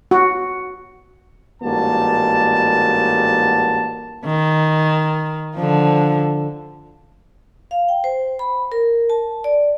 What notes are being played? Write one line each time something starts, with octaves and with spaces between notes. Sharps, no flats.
F#4
A1 G#2 G3 A#3 F#4 A5
D#3
D3 F3
F5
G5
C5
B5
A#4
A5
D5